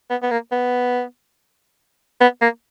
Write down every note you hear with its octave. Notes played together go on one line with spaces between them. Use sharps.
B3
B3
A#3
B3
B3
A#3